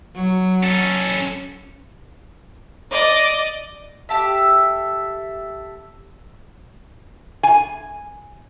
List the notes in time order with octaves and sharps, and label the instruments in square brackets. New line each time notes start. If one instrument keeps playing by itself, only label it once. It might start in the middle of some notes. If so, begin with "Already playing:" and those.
[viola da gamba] F#3
[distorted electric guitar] C#4 A4
[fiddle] D5 D#5
[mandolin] G4 A4 E5
[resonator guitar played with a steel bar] G#5